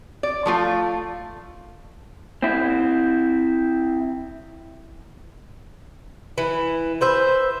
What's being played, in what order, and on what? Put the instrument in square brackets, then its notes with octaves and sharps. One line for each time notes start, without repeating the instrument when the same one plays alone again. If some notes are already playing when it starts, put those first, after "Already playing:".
[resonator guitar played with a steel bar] D5
F3 A3 F4
[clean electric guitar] C4 E4
[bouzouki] E3
B4 C5 E5